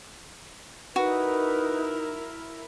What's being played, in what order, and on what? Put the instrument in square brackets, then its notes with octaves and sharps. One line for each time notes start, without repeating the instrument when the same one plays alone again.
[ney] D#4 [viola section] E4 A#4 [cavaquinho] F#4 [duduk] B4